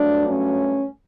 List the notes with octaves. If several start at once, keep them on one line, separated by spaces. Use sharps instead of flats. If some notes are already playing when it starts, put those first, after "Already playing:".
Already playing: G2 F#3 A3 D4
C#4